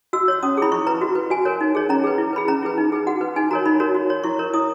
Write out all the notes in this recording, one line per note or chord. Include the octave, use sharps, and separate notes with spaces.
F#4 E6
C#5
C#4 D#6
E4 G#4 B5
E4 C#6
B4 A#5
F#4
B4
F#4 G#5
A#4 C#5
D#4
G#4 C#5
C#4 A#5
G#4 B4
E4
G#4 B4 B5
C#4 A#5
E4 G#4 B4
D#4
G#4 B4
F#4 F#5
B4
D#4 G#5
F#4 A#4 C#5 A#5
D#4 B5
F#4 A#4 C#5
F#4
C#5
E4 C#6
A#4 C#5
E4 D#6